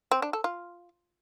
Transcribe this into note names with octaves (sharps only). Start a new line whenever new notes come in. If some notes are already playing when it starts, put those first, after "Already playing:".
C4
D4
A4
F4